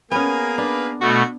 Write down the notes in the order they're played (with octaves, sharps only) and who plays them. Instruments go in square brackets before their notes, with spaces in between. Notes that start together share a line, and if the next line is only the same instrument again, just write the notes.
[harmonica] A#3 G#4 A#4 [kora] B3 C#4 [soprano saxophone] G#5
[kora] D4 [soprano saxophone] B4
[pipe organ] B2 A3 [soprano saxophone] F#4